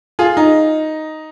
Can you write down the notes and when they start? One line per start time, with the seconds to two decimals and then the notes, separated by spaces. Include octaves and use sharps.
0.19 F4 G#4
0.37 D#4